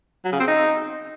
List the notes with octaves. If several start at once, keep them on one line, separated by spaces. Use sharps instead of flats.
F#3
C#3
C4
D#4